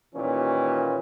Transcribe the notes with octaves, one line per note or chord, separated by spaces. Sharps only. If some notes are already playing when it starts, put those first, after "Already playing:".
D#2 A#2 D#3 E3 C#4